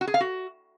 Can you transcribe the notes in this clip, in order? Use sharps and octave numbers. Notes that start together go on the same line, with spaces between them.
F#4
G#4
F5
F#4